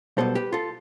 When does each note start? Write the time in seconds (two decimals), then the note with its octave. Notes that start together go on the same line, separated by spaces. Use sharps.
0.17 B1 B2 G3 B3 A4 C5
0.35 G4 B4
0.53 F4 A4